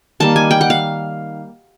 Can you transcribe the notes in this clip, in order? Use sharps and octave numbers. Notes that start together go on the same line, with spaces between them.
D#3 G3 A#3 A5
G#5
G5
F#5
F5